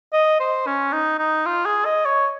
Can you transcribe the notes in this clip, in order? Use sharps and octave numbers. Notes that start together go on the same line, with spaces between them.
D#5
C5
C#4
D#4
D#4
F4
G#4
D#5
C#5